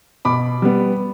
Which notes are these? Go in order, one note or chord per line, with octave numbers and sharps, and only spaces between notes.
B2 B5 D6
G3 B3